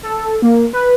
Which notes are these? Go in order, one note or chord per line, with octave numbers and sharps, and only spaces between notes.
A4
A#3
B4